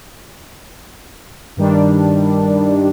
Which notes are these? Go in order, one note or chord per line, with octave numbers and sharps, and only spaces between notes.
G2 D#3 G3 D4